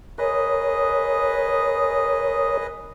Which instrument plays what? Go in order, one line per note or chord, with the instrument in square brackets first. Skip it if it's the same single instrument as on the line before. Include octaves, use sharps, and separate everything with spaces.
[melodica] G#4 B4 D#5 [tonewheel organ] A#4 C#5